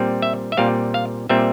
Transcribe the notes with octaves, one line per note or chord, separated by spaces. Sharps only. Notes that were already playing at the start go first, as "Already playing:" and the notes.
Already playing: A#2 G3 C4
E5
E5
A#2 G3 C4 F5
F5
A#2 G3 C4 E5